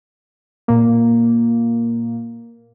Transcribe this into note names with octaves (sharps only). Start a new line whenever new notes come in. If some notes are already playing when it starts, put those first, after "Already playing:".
A#2 A#3